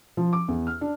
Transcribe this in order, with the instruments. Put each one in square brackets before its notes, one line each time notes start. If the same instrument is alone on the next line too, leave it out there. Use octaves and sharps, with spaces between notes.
[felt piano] F3
D6
E2
F6
D4